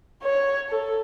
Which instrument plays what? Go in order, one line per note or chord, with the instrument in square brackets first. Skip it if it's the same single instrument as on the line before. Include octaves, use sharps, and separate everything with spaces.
[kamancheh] C#5
A4